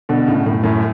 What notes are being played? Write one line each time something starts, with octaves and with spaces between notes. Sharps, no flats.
B2 D3
A2 C#3
F#2 A2
F#2 A2